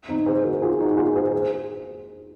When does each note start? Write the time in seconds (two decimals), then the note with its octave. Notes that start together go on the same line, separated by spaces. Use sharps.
0.08 C4 D#4
0.26 G#4 C5
0.44 F#4 A#4
0.62 F4 G#4
0.80 D#4 F#4
0.97 F4 G#4
1.15 G#4 C5
1.33 G#4 C5